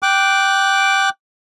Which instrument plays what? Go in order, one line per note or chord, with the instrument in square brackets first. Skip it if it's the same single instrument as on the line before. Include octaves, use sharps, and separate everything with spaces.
[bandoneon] G5 D6 F#6